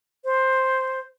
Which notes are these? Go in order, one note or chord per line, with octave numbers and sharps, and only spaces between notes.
C5